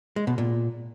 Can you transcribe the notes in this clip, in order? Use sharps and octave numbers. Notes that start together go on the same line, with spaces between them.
G#3
B2
A#2